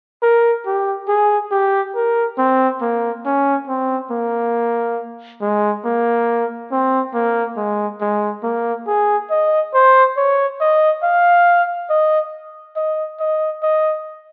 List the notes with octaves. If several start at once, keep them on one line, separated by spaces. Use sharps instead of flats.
A#4
G4
G#4
G4
A#4
C4
A#3
C#4
C4
A#3
G#3
A#3
C4
A#3
G#3
G#3
A#3
G#4
D#5
C5
C#5
D#5
F5
D#5
D#5
D#5
D#5